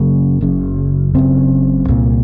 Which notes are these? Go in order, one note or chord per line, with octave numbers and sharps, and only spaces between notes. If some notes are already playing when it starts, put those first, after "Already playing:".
Already playing: F#1 F#2 C#3 A#3
F#1 F#2 C#3
F#1 F#2 C#3 C4
C2 A#2